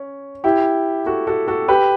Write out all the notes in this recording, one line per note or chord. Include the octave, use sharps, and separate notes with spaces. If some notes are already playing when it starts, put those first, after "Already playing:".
Already playing: C#4
E4 G4
F#4 A4
F#4 A4
F#4 A4
G4 B4